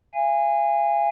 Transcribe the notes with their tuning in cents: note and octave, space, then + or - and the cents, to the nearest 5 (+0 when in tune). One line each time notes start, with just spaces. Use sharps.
F5 -40 G#5 -20